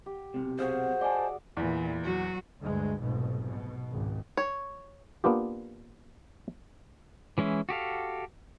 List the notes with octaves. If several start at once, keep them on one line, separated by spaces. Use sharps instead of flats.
G4
B1 G2 C3
F#4 G#4 C5 F5
D5 D#5 G#5 A5
E2 A#2 E3
F#3 F#4
D2 G2 G#3
F1 B1 G#2 B2
B2
G#1 C#2
C#5
A#3 B3 D4 F4 G4
E3 G#3 C#4 E4
F#4 G4 A4 F5